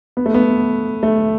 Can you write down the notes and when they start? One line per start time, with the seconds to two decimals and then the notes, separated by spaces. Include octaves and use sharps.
0.17 B3
0.26 A3
0.34 B3
1.03 A3